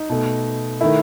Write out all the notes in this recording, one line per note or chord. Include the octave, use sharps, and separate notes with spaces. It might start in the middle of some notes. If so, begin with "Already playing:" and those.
Already playing: D#4
B2 A3
D#3 A3 E4